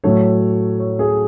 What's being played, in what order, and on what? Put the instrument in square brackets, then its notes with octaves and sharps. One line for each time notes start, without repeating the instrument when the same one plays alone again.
[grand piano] A2 F#3 A3 C#5
C#5
G#4